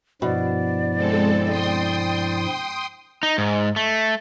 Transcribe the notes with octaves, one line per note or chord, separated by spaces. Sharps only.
G2 B2 F3 E4 D5
G#3 C4 A4
D#5 G5 C6 D#6
D#4
G#2
A3